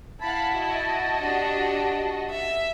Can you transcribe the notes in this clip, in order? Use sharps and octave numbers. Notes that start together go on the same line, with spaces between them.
E4 F5 F#5 A5 B5
F#4 D#5
D4 G4
E5